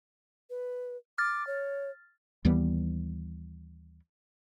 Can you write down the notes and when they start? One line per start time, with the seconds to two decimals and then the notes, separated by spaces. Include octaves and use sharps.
0.50 B4
1.18 D6 F6 A6
1.47 C#5
2.45 D#2 E3 G3 B3